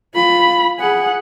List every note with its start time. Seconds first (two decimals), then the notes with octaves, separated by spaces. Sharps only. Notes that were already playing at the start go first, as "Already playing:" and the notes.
0.14 F4 B5
0.79 G#4 F#5